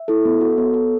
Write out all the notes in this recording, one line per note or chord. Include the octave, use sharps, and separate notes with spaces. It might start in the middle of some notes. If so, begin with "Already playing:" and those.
Already playing: E5
E4 A4
B3
F#4 A4
B3 C#5
A4